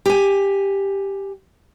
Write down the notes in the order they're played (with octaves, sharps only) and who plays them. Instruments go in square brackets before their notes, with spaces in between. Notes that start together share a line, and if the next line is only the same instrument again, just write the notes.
[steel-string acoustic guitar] G4 G#5